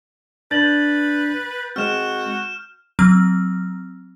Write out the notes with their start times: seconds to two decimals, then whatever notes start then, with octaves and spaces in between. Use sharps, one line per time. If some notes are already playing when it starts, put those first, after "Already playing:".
0.51 D4 B4 G6 A6 F#7
1.76 G#3 C4 F#4 F6 E7
2.99 F#3 C4 F6